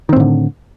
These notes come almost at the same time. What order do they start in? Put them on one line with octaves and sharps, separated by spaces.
D#3 C4 A2 D3